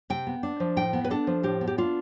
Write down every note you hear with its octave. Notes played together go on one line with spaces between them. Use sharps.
C3 G5
B3
D4
F3
A2 G5
B3
B4
D4 A4
F3
A2 G4
B3
G4
D4 F4